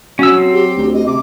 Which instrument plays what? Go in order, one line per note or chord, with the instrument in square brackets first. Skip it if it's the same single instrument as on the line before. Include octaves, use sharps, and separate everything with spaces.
[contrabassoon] F#3 [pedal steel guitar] C#4 E6
[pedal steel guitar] C4
[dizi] G4
[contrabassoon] D2
[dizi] D#5
[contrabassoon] C3 [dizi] D6